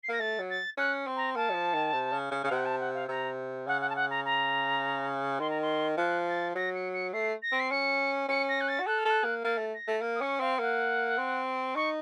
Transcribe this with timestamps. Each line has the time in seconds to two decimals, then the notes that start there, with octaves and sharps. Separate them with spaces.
0.03 C7
0.09 A#3 A#6
0.20 A3 A6
0.39 F#3
0.49 A6
0.78 C#4 F#6
1.07 C4
1.16 A#5
1.36 A#3 A5
1.50 F#3
1.54 F3
1.74 D#3
1.93 C3
2.13 C#3
2.31 C#3
2.44 C#3 F5
2.51 C3 F#5
2.65 A5
2.79 F#5
2.94 F5
3.08 C3 A#5
3.67 C#3 F#5
3.81 F#5
3.89 A5
3.95 F#5
4.10 A#5
4.25 A#5
5.40 D#3 C6
5.50 A#5
5.61 C6
5.97 F3 F#6
6.27 A6
6.55 F#3 A#6
6.74 C#7
6.93 C#7
7.13 A3 C7
7.42 A#6
7.52 C4
7.59 C7
7.70 C#4 C#7
8.29 C#4 C#7
8.48 A#6
8.60 F#6
8.68 A6
8.80 F#4
8.87 A4 F#6
8.98 F6
9.05 A4 F#6
9.24 A#3
9.44 A#3 A6
9.58 A3
9.73 A#6
9.88 A3
10.02 A#3
10.15 D#6
10.21 C#4 C#6
10.40 C4 F5
10.59 A#3 F#5
11.18 C4
11.75 D#4 C#6